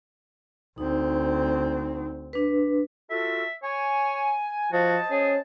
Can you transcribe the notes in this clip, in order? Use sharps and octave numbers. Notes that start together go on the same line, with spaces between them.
D2 C4 D#4
D4 B4
F4 F#4 A4 E5
C#5 G#5
F3 F#4 C5 D#5 A5
C#4 G#4